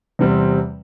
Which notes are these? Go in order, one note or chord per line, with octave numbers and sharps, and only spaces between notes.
E2 C3 G3 C4